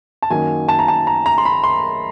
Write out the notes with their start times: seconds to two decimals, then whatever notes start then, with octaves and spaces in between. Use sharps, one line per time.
0.22 A5
0.30 F#2 D#3 F#3 A#3 C#4 G#5
0.68 A5
0.79 A#5
0.88 A5
1.07 A#5
1.26 A#5
1.38 C6
1.45 B5
1.64 C6